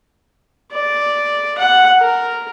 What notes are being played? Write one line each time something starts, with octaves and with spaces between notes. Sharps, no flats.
D5
F#5
A#4